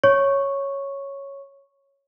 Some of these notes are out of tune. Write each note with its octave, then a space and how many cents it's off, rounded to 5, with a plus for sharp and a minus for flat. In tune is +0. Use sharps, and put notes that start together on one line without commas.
C#5 +0 C#6 -5